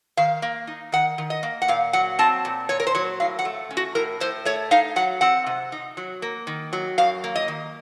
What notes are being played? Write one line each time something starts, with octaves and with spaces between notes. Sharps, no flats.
D#3 F5
A#3
D#4
D#3 F#5
D#3
D#5
A#3
F#5
A#2 F5
F#3 F#5
C4 A5
A#2
A#2 C#5
A#4
C5
F#3 C#5
A2 F5
F#5
A3
C#4
F#4
A2 A#4
A2 C5
A3 C#5
D#4 F5
F#3 F#5
C4 F#5
C3
D#4
F#3
A#3
D#3
F#3
F#2 F5
A#3
D#5
D#3